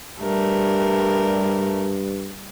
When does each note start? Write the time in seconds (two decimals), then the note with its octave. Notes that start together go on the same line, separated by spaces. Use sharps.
0.20 G2 G3 A3 A#4